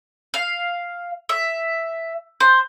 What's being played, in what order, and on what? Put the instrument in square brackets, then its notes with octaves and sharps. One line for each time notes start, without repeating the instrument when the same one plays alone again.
[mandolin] F5
E5
C5